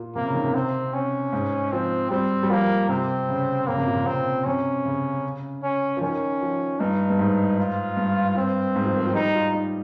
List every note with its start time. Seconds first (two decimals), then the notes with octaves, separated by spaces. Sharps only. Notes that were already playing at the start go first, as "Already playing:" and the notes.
Already playing: A#2
0.15 C3 A#3
0.25 C#3
0.34 D#3
0.44 C3
0.55 C4
0.94 C#4
1.32 G#2
1.72 F3 C4
2.11 G3 C4
2.43 G3
2.49 F3 A#3
2.89 C3 C4
3.28 C#3
3.67 C#3 A#3
3.77 C3
3.86 A#2
3.95 C3
4.06 C3 C4
4.46 C3 C#4
4.85 C#3
5.63 C#4
5.97 F3
6.01 D#3 C#4
6.42 F3
6.80 G2 D#4
7.10 G2
7.19 G#2
7.59 F4
7.97 G2
8.37 C4
8.75 G#2
8.85 F3
8.96 D#3
9.05 F3
9.14 G3 D#4
9.34 F4
9.53 D#4